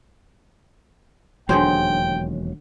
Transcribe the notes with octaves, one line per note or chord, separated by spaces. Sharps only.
E1 D#2 D3 F#3 G#4 C5 G5